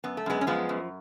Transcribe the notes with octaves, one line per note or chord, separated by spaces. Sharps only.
F#2 B3
A3
F#2 G#3 B3
C#4
F3 G#3 B3
F#2